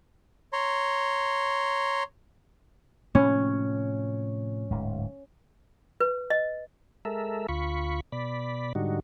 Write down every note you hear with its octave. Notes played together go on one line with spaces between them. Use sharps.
C#5 A#5 C6
A2 C3 F3 C#4
D1 G#2
B4
D#5
G#3 A4 A#4 E5
D2 F4 B5 C#6
B2 D5 B5
G#2 D3 G3 D#4 F#4